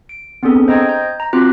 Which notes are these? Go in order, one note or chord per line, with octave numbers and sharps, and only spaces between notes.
D7
B3 C4 D4 G#4 A4
C5 D#5 G5 A#5 D#6 G#6
A#5 G6
A#5
C4 F4 F#4 A#5 D6 F#6